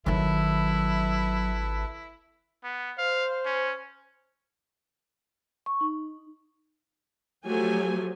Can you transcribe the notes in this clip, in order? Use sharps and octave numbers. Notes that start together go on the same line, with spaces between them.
G#1 D#3 F#3 E4 A4 B4 E5
B3
C5 F5
C#4
C#6
D#4
F3 F#3 A3 G4 G#5